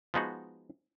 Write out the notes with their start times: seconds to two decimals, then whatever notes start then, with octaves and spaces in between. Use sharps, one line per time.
0.14 F3 G#3 B3 D#4 F#4